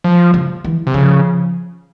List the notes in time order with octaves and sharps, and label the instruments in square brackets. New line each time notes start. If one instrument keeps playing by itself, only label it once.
[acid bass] F3
[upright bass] C#3
E3
[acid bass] C3
[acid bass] C#3 [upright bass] F3